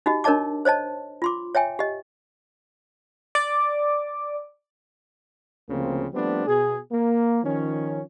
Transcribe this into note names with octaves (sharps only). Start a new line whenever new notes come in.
D#4 F#4 G4 D#5
D4 A#4 C#5 D#5 A5 D6
C5 C#5 D#5 A5
F4 C6 D6
C#5 E5 G5 G#5
G4 D#5
D5 D6
D2 C#3 F3 A#3 C4
F3 G3 A3 B3 C4 D4
B2 G#4
A#3
D#3 F3 C#4